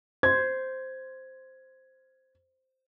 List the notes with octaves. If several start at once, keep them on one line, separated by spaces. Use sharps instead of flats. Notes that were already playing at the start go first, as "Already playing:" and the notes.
C5 G#6